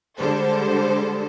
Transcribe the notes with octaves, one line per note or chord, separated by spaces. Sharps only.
D3 G3 G#3 A4 C5